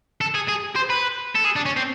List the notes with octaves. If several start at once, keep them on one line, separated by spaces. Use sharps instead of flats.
A4
G#4
G#4
C5
B4
A4
G#4
D4
C#4
C4